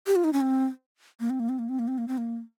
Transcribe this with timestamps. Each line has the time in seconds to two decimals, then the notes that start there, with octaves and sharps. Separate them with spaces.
0.07 G4
0.16 F4
0.24 D#4
0.33 C#4
0.41 C4
1.20 A#3
1.30 C4
1.40 A#3
1.49 C4
1.59 A#3
1.69 C4
1.79 A#3
1.88 C4
1.98 A#3
2.08 C4
2.18 A#3